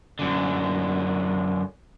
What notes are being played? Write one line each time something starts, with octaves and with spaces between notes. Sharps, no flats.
F#2 D3